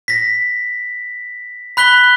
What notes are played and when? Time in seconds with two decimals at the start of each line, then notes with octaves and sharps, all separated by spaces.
0.08 A#6 B6
1.77 B5 F#6 B6 G7